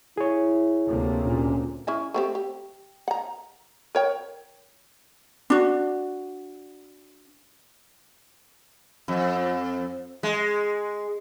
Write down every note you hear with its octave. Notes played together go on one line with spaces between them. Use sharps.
E4 G#4 C#5
D2 C3 A#3
A#2 C#4
C#4 E4 G#4
A3 C4 G4
G4
F#5 A#5
A#4 C#5 G5
D4 F#4
F2
G#3